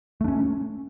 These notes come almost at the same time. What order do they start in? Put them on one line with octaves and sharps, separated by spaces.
A3 D4 C#4